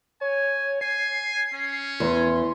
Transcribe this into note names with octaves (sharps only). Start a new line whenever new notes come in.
C#5 G#5
G#5 C7
C#4
E2 C6